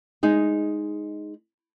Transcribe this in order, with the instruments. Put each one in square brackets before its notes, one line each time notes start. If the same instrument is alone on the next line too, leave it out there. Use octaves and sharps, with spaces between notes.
[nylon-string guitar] G#3 D#4 G#4